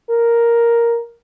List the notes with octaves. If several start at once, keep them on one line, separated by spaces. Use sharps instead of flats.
A#4